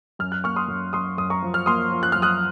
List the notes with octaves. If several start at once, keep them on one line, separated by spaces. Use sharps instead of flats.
F#2 F6
F#6
A#3 C#6 F6
C6 D#6
F#2
F#2 C6 D#6
F#2 D#6
A#5 C#6
F3
F6
A#3 C6 D#6
F3
F#6
F#2 F6
D#6 F#6